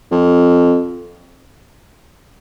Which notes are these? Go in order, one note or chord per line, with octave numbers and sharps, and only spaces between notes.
F2